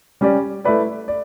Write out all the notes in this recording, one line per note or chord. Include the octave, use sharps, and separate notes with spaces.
G3 C#4 G4 D5
A3 E4 B4 D5
D5